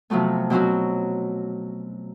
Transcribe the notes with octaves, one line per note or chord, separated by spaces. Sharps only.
C3 F3 F#3 A3 B3
B2 F#3 C4 C#4 F#4